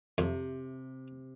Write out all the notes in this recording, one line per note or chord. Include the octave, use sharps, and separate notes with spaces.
F2 C3